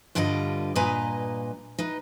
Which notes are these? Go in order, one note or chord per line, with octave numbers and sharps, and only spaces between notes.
G2 D3 G3 F4 A#4 D#5
G2 A#2 B4 D#5 G#5 A#5
D#4 B4